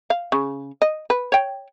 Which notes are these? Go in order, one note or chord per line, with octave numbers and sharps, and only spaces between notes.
F5
C#3
D#5
B4
C#5 G5